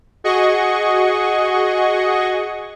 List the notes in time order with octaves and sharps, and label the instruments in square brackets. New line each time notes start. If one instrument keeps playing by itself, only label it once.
[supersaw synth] F#4 G#4 D#5 C#6